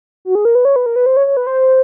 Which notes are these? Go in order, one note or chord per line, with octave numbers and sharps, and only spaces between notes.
F#4
G#4
A#4
B4
C#5
B4
A#4
B4
C5
C#5
C#5
B4
C5